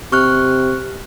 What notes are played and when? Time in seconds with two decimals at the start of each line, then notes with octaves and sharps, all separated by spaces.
0.12 C3 C#6 F6 F#6